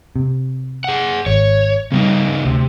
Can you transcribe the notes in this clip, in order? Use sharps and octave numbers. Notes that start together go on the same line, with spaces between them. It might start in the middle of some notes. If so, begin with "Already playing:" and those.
C3
G#4 F#5
G#1 C#5
C#3 G3 B3 C4 D#4
D2 C3